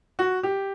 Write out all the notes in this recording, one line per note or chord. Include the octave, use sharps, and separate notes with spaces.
F#4
G4